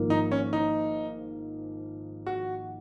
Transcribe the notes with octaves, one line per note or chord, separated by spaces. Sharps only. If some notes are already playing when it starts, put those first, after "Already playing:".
Already playing: G#1 G#2 F3 A#3
D#4
C#4
D#4
F#4